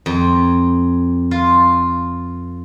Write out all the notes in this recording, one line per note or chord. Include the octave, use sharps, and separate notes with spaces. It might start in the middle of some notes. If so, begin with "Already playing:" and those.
F2
F4